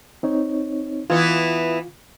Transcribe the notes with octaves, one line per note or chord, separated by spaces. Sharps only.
C4 D#4 C#5
E3 B3 E4 F4